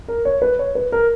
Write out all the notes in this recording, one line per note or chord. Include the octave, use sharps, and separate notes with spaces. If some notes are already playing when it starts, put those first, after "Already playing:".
A#4
C#5
B4
C#5
B4
A#4